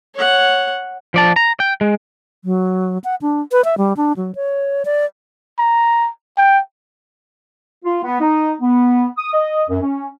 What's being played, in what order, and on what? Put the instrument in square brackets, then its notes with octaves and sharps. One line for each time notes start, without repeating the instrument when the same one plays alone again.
[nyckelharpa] C#5 F#5
[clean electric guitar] F3 D5 A5
A#5
G5
G#3
[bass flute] F#3
F#5
D4
B4
E5
G3
D4
F#3
C#5
D5
[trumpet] A#5
G5
[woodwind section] F4
B3
D#4
B3
D#6
D#5
F#2
C#4